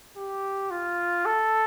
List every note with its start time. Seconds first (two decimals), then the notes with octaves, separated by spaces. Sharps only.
0.16 G4
0.71 F4
1.25 A4